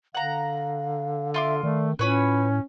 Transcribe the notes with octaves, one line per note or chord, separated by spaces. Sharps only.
D3 F5 F#5 A#5
F4 E5 C6 D6
D#3 A3 D5
A2 C#4 F4 B4 C#5 B5